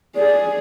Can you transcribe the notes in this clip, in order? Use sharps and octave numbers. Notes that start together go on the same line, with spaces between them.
G#4 D5